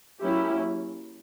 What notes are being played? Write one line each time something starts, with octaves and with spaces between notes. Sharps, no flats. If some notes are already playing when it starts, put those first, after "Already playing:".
F#3 A#3 C#4 E4 G4